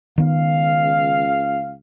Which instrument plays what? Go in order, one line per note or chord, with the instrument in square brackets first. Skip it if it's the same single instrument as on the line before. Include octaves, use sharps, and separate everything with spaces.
[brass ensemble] C#2 F5 [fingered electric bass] D#3 B3